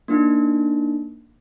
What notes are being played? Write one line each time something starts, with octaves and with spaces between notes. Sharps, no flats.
A#3 D4 D#4